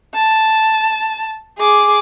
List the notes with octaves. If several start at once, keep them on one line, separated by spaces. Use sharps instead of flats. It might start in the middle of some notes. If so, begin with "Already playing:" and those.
A5
G#4 D6